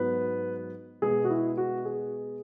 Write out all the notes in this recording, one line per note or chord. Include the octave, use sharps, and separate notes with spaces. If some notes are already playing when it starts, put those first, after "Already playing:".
Already playing: G#2 F#3 B3 B4
B2 G#3 B3 G#4
F#4
E4
F#4
G#4